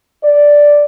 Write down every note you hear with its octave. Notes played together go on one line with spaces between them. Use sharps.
D5